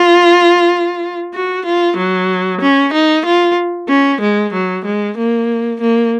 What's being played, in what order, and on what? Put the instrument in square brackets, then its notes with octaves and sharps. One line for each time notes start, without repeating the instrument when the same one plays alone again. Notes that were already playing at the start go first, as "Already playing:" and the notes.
Already playing: [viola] F4
F#4
F4
F#3
C#4
D#4
F4
C#4
G#3
F#3
G#3
A#3
A#3